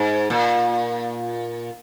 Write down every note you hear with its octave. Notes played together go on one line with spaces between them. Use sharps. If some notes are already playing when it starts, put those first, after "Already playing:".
Already playing: G#2
A#2